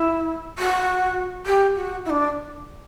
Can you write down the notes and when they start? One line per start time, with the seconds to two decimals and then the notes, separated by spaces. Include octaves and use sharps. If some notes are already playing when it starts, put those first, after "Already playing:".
Already playing: E4
0.58 F#4
1.46 G4
1.75 F#4
2.05 E4
2.09 D4